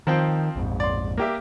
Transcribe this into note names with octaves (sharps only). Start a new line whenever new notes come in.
D#3 F3 C4 G5
A#1 F2 G#2
D5 C6
A#3 G4 E5